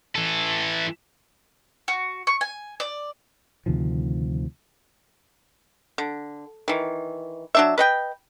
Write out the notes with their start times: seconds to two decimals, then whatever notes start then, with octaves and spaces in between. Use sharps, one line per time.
0.15 E3 A4
1.88 F#4
2.27 C#6
2.41 G#5
2.80 D5
3.66 D2 C3 D#3 F3
5.98 D3
6.68 D#3 E3
7.55 F#3 D4 E5
7.78 B4 D#5 G5